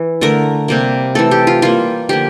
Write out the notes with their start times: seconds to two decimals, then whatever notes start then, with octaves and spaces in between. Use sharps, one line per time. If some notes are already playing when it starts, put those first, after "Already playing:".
Already playing: E3
0.21 D3 A3 A#4
0.68 C3 G3 A#3
1.15 E3 A3 A4
1.31 G4
1.47 F4
1.62 E3 G3 A#3 F4
2.09 D3 F3 A#3 G4